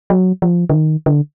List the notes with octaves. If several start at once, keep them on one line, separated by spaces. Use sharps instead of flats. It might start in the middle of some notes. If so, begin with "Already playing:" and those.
F#3
F3
D3
D#3
D3